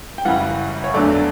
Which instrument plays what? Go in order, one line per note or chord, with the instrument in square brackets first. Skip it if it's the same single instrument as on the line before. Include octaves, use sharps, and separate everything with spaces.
[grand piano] G5
F#2 C#3 E3 G3 F#5
C#5
E2 D3 F#3 A3 D5